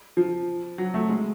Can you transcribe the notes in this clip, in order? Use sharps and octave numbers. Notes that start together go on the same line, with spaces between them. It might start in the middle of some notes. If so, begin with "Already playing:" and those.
F3
F#3
A3
G#3